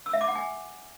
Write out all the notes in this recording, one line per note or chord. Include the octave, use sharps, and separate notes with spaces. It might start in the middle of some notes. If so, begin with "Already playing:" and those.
E6
E5
D6
F#5
G#5